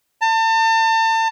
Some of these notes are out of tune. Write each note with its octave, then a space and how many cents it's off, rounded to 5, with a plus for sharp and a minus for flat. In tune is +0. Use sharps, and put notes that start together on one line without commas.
A5 +35